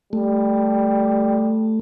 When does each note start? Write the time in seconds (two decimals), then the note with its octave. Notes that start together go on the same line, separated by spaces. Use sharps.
0.13 G3 A3